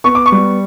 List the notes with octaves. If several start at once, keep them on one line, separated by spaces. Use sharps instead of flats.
B3 C#6
D6
C#6
G3